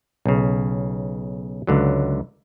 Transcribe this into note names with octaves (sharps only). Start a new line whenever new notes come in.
B1 C#3
C#2 D3 F#3